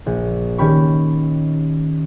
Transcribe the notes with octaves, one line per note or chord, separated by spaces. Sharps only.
A#1
D#3 C#4 G4 B5 C#6